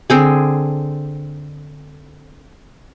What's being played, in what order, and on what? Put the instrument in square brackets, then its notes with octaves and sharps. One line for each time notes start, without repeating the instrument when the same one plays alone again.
[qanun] D3 C4 G#4